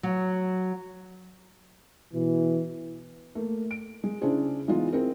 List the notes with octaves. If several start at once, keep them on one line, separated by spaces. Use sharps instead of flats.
F#3
B2 E3
A3 A#3
D7
G#3
C#3 C#4 D4 E4 G#4 C5
E3 G#3 B3 D#4 F4
C4 E4 G#4 A#4